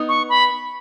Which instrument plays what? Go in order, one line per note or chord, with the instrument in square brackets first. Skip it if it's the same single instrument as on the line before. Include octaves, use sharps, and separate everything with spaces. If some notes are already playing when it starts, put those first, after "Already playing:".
Already playing: [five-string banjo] B3 D#4
[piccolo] C#6
B5